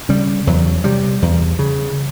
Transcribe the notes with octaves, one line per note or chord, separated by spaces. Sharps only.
C#3 G3
E2 F#3
C3 G3
E2
C#3